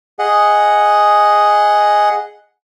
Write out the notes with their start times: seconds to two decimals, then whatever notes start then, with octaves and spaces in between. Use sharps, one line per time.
0.19 G#4 D#5 F#5